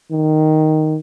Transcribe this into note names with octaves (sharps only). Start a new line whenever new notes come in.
D#3